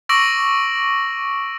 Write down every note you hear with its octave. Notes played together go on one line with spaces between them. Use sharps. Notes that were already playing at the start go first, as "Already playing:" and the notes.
C#6 D6 E6 A#6 D7 F#7